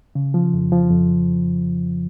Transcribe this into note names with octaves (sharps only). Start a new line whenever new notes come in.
C#3
F3
F2
F3
F2